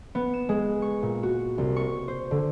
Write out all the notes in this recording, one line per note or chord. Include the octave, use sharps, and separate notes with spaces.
B3
E7
G#3
C#6
A#2
F#4
C2
C#6
C5
D3